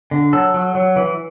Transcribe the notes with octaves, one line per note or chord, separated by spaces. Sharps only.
D3
F#3 A4
F#3
F#3
E3